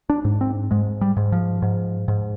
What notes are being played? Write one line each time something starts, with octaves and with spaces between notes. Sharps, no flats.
D4
G#2
C4
G#2 G#3
G3
G#2
F3
G#2
G#2